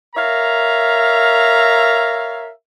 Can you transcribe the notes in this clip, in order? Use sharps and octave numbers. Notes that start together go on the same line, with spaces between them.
A#4 C#5 E5 F5 A#5